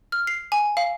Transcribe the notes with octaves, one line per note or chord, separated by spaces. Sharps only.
F6
C7
G#5
F5